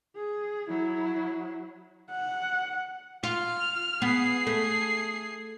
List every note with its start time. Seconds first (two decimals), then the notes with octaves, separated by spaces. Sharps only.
0.15 G#4
0.68 F#3 E4
2.11 F#5
3.23 F4 F6
4.02 B3 G#4 C7
4.47 A3